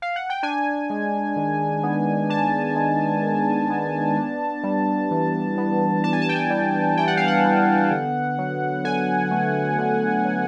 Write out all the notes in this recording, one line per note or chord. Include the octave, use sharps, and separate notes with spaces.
F5
F#5
G5
D4 G#5
G#3
D#3
B3
D4 A5
G#3
D#3
B3
D4
G3
E3
B3
D4 A5
G#5
A5
G5
G#5
G3
E3 G5
F#5
F5
F#5
B3
D3
F#3
D3 G#5
A3
D3
F#3